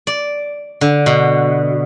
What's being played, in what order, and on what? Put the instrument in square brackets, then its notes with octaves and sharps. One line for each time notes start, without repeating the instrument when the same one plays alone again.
[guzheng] D5
D3
B2